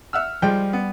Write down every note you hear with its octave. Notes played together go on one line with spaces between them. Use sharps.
E5 F#5 E6 F6
F3 G3 G#3 G5
B3